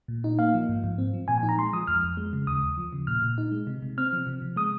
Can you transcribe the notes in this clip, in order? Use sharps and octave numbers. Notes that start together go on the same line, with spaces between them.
A#2
D#4
A#3 F5
F3
G#2
G#2
C4
F3
A#2 G#5
G#5
D#4
A#5
G#3 C6
F3 D#6
F2 F6
F2
G#3
C#3
D#2 D#6
D#2
F3
C#3
A#2 F6
A#2
D#4
G#3
C3
C3
C4 F6
F3
C3
C3
G#3 D#6